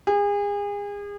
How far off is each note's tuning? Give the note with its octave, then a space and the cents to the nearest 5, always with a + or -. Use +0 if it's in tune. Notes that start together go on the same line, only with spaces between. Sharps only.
G#4 -35